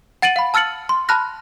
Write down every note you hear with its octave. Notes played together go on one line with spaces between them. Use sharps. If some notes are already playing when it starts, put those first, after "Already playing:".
F#5 A6 D7 D#7 F#7
F5 B5
A5 E6 F6 A6 C#7 F#7
C6
A5 B5 F6 F#6 A#6